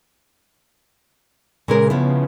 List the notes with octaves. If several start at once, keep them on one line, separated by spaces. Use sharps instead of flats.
A#2 C#3 G#3 A#4
F3 B3 E4